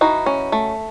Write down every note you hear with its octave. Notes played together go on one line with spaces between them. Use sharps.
E3 D#4 F#4
C#4
A3